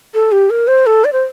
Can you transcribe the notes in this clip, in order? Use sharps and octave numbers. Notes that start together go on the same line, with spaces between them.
A4
G4
A#4
C5
A4
D5
C5